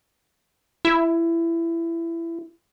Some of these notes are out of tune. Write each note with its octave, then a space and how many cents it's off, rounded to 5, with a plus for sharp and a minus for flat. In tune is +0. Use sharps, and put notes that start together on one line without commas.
E4 +20